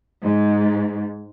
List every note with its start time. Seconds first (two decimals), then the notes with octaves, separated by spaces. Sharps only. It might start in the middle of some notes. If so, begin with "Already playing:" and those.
0.22 G#2